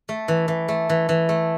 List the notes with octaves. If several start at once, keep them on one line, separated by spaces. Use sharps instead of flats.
A3
E3
E3
A3
E3
E3
A3